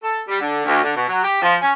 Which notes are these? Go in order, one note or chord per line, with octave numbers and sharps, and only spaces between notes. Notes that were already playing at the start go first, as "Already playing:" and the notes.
A4
G3
D3
D2
D3
B2
F#3
G4
F3
C#4